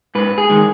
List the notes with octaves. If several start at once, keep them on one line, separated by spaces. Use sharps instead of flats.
G#2 B4
G#4
D#3 G#3